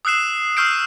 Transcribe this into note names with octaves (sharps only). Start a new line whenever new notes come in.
D#6 E6 F#6 C7 E7
C#6 E6 F6 G6 C7 D7